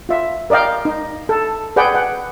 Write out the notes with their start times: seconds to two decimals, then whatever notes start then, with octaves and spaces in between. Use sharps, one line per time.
0.09 F4 E5
0.50 A#4 D5 D#5 F5 G5
0.85 D#4
1.29 A4
1.76 G#4 B4 D5 F#5 G5
1.95 F#5 G5